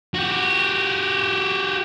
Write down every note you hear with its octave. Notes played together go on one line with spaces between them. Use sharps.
F#4 G4